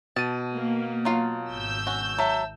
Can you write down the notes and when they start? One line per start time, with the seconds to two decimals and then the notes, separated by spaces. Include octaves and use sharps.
0.16 B2 A5 D#7
0.56 A#3
1.05 F#3 F4 F5
1.50 G#1 E6 G6
1.87 C#4 F#4
2.19 F#3 E5 A5